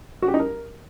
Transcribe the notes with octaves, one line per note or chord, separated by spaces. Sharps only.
F#4
G4
D#4
A#4